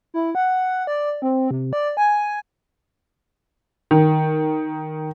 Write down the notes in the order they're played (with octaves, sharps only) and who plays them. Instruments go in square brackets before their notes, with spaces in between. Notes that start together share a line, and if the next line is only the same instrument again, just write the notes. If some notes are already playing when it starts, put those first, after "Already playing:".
[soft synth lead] E4
F#5
D5
C4
C3
D5
G#5
[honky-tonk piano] D#3